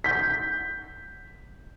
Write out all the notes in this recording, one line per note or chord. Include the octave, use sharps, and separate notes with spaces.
G6 B6